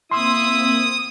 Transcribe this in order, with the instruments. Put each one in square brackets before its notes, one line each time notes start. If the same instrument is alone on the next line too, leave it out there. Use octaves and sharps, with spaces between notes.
[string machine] A#3 C4 [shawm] E4 [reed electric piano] C6 E6 [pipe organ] D#6